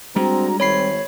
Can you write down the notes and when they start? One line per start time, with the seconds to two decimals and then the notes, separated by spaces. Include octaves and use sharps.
0.16 G3 G#3 C4 D4 F#4 A#5
0.60 G#1 C4 C#5 B5 C7